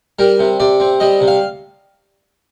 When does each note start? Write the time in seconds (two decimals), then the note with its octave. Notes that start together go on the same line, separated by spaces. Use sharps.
0.19 G3 A#4
0.39 C3
0.60 C3 D5
0.80 C4
1.00 G3 D#5
1.21 C3
1.28 F5